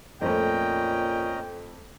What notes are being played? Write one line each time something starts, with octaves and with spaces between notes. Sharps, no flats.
F2 A#2 A3 C#4 D#5 G5 A#5